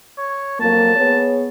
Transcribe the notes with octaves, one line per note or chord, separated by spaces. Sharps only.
C#5
F2 F#3 A#3 A5
B3 G#4 C#5